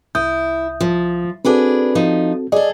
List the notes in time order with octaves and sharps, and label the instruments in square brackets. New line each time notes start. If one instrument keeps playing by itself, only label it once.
[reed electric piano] C2 D#6 G6 [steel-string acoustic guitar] E4
[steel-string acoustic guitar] F3
[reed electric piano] C4 F#4 A4 [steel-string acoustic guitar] D4 G#4 B4
[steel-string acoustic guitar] F3 D#4
[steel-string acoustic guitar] G#4 A4 [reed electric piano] D5 D#5